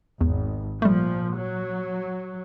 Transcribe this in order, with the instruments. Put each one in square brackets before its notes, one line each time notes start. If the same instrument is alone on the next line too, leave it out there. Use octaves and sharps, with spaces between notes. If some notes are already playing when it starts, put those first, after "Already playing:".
[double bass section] G#1 [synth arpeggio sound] E2
[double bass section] A#2 F3 [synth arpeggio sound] G3 A3
[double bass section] F#3